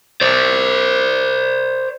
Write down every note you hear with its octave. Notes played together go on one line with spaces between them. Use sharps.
C5 D5